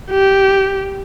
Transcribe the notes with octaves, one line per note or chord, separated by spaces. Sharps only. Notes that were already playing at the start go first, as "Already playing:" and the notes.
G4